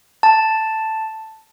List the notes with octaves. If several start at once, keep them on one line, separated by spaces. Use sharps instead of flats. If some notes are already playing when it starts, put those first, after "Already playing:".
A5